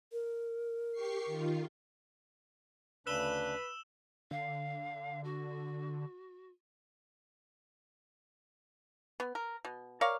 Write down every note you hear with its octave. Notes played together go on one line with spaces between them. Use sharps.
A#4
G4 C#6 C7
D#3 F4
D2 C#3 D4 B4 E6 E7 G7
D3 F5
F#4
B3
A#4
B2
A#4 C#5 D5 F5